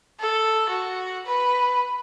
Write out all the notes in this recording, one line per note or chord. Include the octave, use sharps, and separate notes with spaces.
A4
F#4
B4